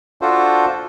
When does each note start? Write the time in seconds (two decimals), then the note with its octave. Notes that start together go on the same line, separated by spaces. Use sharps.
0.22 D4 F4 F#4 A4 C5